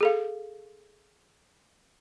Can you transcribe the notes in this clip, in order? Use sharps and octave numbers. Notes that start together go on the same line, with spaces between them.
G#4 A4 F5